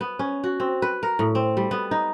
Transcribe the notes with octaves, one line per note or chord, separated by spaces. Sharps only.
B3
C#4
F#4
C4
B4
A#4
A2
C4
G3
B3
D#4